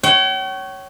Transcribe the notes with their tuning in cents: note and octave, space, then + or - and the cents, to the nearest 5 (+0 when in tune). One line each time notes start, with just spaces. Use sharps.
C#5 +0 G5 -45